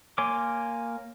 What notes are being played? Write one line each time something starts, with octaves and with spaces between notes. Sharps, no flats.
A#3 C#5 G#5 C6 D6